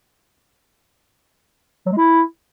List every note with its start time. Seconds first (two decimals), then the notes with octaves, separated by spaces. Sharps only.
1.86 F#3
1.92 G#3
1.97 E4